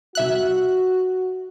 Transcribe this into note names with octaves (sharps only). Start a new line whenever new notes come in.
C2 F#4 E5 F#6